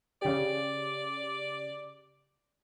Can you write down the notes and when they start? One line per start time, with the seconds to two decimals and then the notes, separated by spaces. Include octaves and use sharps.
0.22 C#3 G4 D5